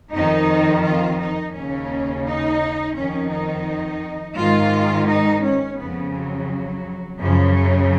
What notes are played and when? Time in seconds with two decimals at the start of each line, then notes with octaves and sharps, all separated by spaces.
0.12 F2 D#3 D#4
0.82 F4
1.19 D#4
1.53 D#2 C#3 C#4
2.25 D#4
2.94 F2 D#3 C#4
3.31 D#4
4.36 G#2 D#3 F4
5.07 D#4
5.43 C#4
5.77 F2 C#3 B3
6.12 F#3
7.18 F#2 C#3 F3
7.55 F#3